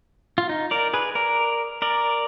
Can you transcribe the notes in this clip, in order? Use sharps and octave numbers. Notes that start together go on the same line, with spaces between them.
F4
D#4
A#4 D5
G#4 B4
A#4 D5
A#4 D5